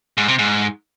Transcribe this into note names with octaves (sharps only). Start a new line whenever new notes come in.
G#2
C3
G#2